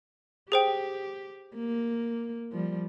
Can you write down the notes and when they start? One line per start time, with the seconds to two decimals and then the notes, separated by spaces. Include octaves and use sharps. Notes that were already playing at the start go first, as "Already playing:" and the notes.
0.52 G4 G#4 C5 G5
1.55 A#3
2.52 F3 G3